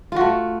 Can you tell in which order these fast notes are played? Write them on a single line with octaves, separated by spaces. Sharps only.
F4 F#4 A3